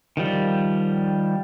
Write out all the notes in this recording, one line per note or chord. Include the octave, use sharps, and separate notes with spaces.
D#3 F3 G3